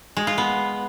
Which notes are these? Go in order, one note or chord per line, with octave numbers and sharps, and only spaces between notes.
G#3
F4
B3